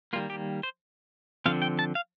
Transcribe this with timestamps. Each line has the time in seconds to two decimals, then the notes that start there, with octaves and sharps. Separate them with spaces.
0.13 D#3 G3 A#3 F4
0.30 G4
0.63 C5
1.46 D3 F3 C4 F5
1.62 G5
1.79 A5
1.95 F5